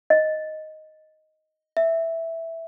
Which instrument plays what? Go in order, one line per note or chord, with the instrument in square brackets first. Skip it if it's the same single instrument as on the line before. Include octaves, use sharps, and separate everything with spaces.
[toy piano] D#5
[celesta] E5